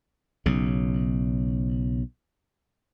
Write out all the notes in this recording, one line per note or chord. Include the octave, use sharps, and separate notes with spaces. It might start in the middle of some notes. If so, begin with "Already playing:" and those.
B1 C#3